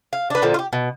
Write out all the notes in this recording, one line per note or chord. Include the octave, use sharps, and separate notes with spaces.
F5
D4 B4
A#2 D3 F3
F4 G4
B2